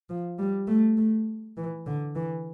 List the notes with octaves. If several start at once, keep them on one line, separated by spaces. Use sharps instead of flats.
F3
G3
A3
A3
E3
D3
E3